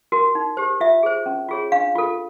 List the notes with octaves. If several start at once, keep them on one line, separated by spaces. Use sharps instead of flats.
F#4 A#4
D#4
G4 C5
F4 E5
G#4 C5
C#4
F4 G#4 C#5
D4 F5
F4 A4